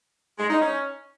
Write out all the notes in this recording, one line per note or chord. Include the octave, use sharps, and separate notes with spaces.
G#3
D#4
C#4